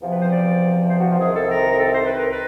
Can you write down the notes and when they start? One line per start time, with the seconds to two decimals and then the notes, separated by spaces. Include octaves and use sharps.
0.02 E2 C3 F3
0.11 B4
0.21 C5
0.31 D5
0.89 C5
0.99 F#4
1.09 F4
1.19 C2 C3 D#3 G#4
1.34 A4
1.49 A#4
1.72 A#4
1.78 A4
1.93 C5
2.05 B4
2.17 A#4
2.30 B4